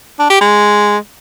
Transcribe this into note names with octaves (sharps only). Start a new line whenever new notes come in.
D4
G4
G#3